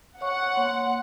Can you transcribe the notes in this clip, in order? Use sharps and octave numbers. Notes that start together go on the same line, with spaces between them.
C#5 F#5 C#6
A#3 C#5 C6